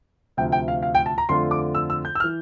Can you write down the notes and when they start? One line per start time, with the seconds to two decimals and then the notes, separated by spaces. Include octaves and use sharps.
0.37 D2 C3 F3 G5
0.52 G5
0.68 F5
0.83 F5
0.95 G5
1.06 A5
1.18 A#5
1.29 F2 D3 A3 D4 F4 C6
1.51 D6
1.75 E6
1.90 E6
2.05 G6
2.15 E6
2.20 F6
2.24 E3